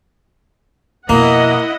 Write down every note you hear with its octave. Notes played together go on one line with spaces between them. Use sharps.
F2 B2 A#3 E4 D#5 F#5